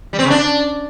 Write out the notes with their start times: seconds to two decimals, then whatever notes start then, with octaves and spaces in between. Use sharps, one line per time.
0.13 G3
0.19 C4
0.25 C#3
0.30 D4